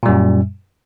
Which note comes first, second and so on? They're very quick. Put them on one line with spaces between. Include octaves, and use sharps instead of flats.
A#2 G3 F#2